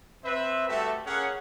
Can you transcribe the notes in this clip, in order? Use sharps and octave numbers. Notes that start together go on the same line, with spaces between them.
C4 B4 E5
G3 A3 F#4 G4 A4 E5
A#3 C#4 G#4 F#5